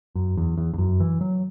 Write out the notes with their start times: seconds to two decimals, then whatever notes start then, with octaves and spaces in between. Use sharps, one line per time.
0.15 F#2
0.37 E2
0.58 E2
0.74 E2
0.78 F#2
1.00 E3
1.21 F#3